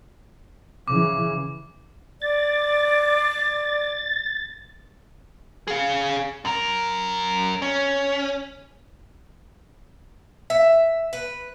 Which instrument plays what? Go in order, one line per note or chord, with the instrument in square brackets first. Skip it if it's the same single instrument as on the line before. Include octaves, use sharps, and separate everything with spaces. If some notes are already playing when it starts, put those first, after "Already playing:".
[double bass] C#3 E3 [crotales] D6
[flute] D5 [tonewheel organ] A6
[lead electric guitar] G#4 F5
F#2 A#4
C#4
[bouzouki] E5
B4